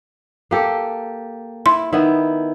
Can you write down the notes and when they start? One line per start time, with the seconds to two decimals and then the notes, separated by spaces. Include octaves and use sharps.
0.51 A#3 G4 A4
1.66 E4 C6
1.93 D#3 B3 E4